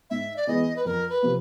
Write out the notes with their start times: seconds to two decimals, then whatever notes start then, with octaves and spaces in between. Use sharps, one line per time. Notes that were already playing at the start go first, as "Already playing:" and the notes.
0.10 G#2 E5
0.37 D5
0.47 E3 G#3 B3 D#5
0.76 B4
0.85 F2 A#4
1.10 B4
1.22 C3 F3 A#3